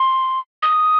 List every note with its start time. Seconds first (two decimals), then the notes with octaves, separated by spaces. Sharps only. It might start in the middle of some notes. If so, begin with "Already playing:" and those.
Already playing: C6
0.62 D#6